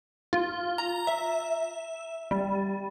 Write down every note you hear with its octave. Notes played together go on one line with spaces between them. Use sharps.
F4
A#5
E5
G3